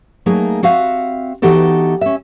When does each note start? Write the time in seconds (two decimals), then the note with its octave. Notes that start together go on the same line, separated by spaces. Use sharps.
0.26 F#3 A3 A#3 D#4 G#4
0.63 C4 F#4 E5 F5
1.42 E3 B3 D#4 F#4 G4 A4
2.01 C#4 E5